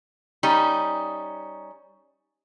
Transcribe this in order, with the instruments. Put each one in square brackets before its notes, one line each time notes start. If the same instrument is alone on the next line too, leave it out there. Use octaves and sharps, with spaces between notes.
[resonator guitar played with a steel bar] G3 C#4 D#4